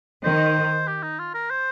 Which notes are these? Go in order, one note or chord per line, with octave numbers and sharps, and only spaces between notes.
D#3 C5
G4
D#4
F4
A#4
C5